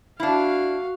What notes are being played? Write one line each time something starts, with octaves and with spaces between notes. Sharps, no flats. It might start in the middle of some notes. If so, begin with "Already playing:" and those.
D4 E4 F#4 F5